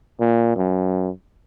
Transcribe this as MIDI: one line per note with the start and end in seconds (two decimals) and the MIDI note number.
0.20 0.54 46
0.56 1.10 42